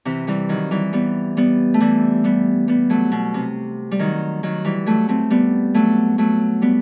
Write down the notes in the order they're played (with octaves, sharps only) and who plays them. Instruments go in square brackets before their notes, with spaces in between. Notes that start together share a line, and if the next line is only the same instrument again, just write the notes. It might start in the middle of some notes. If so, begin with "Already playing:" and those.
[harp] C3 E3
E3 G3
D#3 F#3
E3 G3
G3 B3
G3 B3
A3
E3 G3
G3 B3
G3 B3
F#3 A3
B2
C3
G3
D#3 F#3
D#3 F#3
E3 G3
F#3 A3
A3 C4
G3 B3
F#3 A3
F#3 A3
G3 B3